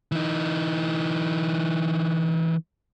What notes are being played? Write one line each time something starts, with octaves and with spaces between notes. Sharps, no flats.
E3 D#4